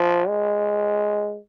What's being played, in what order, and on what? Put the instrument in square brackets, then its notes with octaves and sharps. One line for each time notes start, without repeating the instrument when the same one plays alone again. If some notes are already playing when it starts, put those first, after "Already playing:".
Already playing: [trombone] F3
G#3